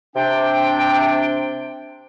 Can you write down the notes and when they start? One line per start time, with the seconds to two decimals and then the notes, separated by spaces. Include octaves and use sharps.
0.15 C3 D4 G5